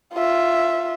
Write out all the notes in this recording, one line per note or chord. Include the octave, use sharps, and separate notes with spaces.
F4 E5